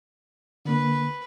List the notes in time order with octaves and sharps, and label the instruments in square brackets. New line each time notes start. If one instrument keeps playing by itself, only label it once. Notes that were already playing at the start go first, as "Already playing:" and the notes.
[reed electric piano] D3 A#3 [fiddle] B4